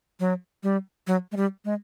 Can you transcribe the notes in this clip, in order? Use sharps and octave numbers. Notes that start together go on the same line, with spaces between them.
F#3
G3
F#3
G#3
G3
G#3